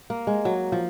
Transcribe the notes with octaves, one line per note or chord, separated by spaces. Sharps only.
A#3
G#3
F#3
F3